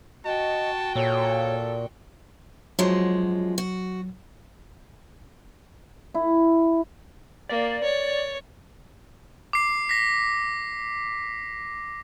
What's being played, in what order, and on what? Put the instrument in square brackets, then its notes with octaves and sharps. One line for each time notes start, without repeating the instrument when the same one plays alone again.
[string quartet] F#4 G5 C#6 [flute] D#5 [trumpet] A5
[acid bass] A#2 [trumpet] A4 [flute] C#5
[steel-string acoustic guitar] F#2 F3 G#3 [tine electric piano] F#3
[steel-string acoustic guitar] F#4
[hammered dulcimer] E4
[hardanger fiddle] A#3 [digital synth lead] D5
[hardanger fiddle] C#5
[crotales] D6 C7
A#6 B6